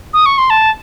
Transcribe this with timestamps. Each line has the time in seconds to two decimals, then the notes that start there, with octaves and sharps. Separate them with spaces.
0.13 D#6
0.26 C#6
0.38 C6
0.50 A5